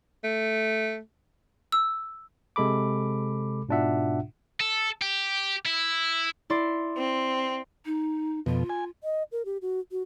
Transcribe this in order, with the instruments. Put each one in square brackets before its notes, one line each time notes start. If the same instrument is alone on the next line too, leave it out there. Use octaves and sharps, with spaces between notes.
[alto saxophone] A3
[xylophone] E6
[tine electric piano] C3 G#3 A4 B5 D6
G#2 B2 D4 F4 E5 F#5
[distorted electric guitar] A4
G4
E4
[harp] E4 D5 C6
[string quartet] C4
[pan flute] D#4
[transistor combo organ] F2 B2 [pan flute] F4
[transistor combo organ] G#5
[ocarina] D#5
A#4
G4
F#4
F#4